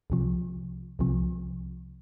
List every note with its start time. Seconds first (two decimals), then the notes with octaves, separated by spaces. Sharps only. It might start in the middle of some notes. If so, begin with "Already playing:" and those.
0.10 C2 C3 F3
0.99 C2 C3 F3